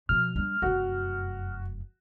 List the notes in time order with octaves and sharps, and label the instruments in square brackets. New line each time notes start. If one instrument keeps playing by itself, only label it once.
[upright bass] B2 F3 [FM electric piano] F6
[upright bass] G3 D4
[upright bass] F1 F#2 [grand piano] F#4